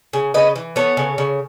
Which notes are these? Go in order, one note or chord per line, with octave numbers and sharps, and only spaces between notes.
C#3
C#3 B4 D#5
E3
B3 A4 C#5
C#3
C#3